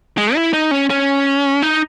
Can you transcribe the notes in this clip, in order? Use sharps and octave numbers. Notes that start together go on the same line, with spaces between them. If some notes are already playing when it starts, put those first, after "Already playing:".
G#3
E4
D#4
C#4
C#4
D#4